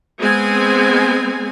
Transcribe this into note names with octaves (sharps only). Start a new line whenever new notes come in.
G#3 B3 C4 G#5